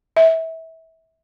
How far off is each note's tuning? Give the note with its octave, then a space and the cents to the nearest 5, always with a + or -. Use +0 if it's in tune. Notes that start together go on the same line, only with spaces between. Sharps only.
E5 -25